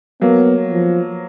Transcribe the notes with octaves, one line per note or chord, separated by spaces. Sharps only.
F#3 A#3 B3
F3